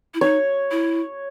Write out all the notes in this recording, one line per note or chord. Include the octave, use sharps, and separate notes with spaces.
E4
D#4 C#5
E4